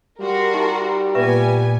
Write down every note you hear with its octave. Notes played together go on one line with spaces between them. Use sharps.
G3 F#4 A#4 C6
D#4 G4 E5
A#2 B3 B4 E5 G#5 C#6